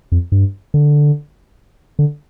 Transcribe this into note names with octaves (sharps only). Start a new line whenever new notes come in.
F2
G2
D3
D3